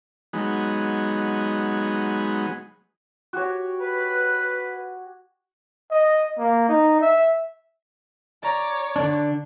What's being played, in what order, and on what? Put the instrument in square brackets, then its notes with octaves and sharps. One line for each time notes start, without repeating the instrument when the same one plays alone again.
[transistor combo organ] F#3 G#3 B3 D#4
[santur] F#4 G4 C#5
[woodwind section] B4
[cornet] D#5
A#3
D#4
E5
[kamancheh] C#5 D6 [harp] D5 A#5
[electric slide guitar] D3 D4